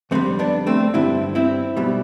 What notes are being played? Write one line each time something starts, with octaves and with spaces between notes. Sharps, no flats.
F2 D3 G3 A3 C4
B3 D4
A3 C4
G2 D3 G3 C4 E4
C4 E4
B1 B2 G3